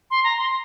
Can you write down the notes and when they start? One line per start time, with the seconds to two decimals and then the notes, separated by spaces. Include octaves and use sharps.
0.11 C6
0.24 A#5
0.38 C6